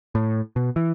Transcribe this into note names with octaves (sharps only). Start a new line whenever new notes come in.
A2
B2
E3